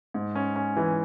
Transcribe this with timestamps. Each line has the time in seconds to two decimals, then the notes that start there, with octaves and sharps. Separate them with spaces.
0.14 G#2
0.35 C#4
0.56 C#4
0.77 E3